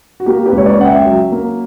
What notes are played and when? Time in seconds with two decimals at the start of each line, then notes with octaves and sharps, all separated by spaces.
0.20 F#4
0.26 A#3 G4
0.46 G4 B4
0.52 C#2
0.58 C#5
0.66 B4 D5
0.78 C#3 F#5
0.85 E5 G5
1.05 F#3
1.32 A#3